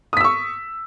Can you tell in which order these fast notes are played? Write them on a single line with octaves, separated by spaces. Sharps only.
D#6 B6 E6 C#6